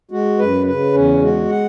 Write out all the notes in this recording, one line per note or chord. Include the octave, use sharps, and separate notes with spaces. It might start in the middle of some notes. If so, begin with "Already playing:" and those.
G#3 F#4
F#2 B4
C#3 B4
E2 C#4
G#3 F#4
F#5